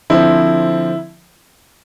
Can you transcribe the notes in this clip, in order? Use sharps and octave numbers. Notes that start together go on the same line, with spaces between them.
D3 F3 C4 E4